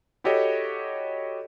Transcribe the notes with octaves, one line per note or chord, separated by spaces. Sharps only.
E4 F#4 G4 A4 C#5 D#5